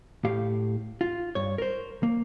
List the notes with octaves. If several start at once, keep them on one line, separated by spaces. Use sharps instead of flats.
A2 G4 F5
F4
G2 C#5
A#4 C5
A#3